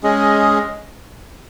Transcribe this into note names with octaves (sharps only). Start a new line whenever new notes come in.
G#3 C#4 G#4 D#5